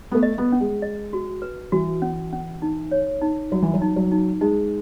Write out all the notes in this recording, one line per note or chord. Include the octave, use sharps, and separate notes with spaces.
B3
A3
D#5
B3
C#4
G#3
D#5
F#4
B4
E3 F#4
C#4
C#4
D#4
C#5
D#4
F#3 F#4
E3
F#3
D#4
F#3
D#4
G#3 D#4